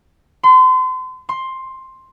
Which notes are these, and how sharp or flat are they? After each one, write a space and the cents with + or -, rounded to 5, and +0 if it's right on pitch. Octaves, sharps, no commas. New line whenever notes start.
C6 -35
C6 +10